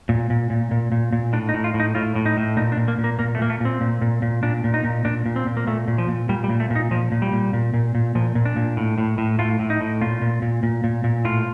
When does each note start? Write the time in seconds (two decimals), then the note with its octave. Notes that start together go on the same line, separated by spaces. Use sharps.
0.09 A#2
0.30 A#2
0.50 A#2
0.71 A#2
0.92 A#2
1.13 A#2
1.33 A2 D4
1.49 D#4
1.54 A2
1.64 F4
1.74 A2
1.80 D#4
1.95 A2 F4
2.15 A2
2.26 D#4
2.37 A2
2.57 A#2 D#4
2.72 D4
2.77 A#2
2.88 A#3
2.98 A#2
3.04 A#3
3.19 A#2 A#3
3.35 A3
3.39 A#2 A#3
3.50 A3
3.60 A#2 C4
3.81 A#2
4.02 A#2
4.22 A#2
4.43 A#2 D4
4.64 A#2
4.74 D#4
4.84 A#2
5.05 A#2 D4
5.26 A#2
5.36 C4
5.46 A#2
5.57 A#3
5.67 A#2 A3
5.88 A#2
5.98 F3
6.08 A#2
6.29 A#2 G3
6.44 G3
6.50 A#2
6.60 A3
6.70 A#2
6.76 D#4
6.91 A#2 F3
7.12 A#2
7.22 G3
7.33 A#2
7.53 A#2
7.74 A#2
7.95 A#2
8.15 A#2 F3
8.35 A#2
8.45 D4
8.56 A#2
8.77 A2
8.98 A2
9.18 A2
9.39 A2 F4
9.59 A2
9.70 D#4
9.81 A2
10.01 A#2 F4
10.21 A#2
10.42 A#2
10.63 A#2
10.84 A#2
11.04 A#2
11.25 A2 F4